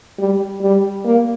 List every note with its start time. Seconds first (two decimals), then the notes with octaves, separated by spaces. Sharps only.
0.18 G3
0.61 G3
1.05 A#3